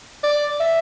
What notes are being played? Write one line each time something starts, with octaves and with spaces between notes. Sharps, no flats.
D5
E5